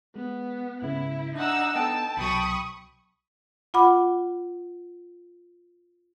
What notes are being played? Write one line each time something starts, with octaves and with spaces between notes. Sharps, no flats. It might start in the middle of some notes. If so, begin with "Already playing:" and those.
G#3 B3
G#2 C#3 E4
D4 D#4 E5 F#5 E6
B3 A4 G5 A5
C2 B2 F#3 B5 C#6 D#6
F4 F#5 B5 D6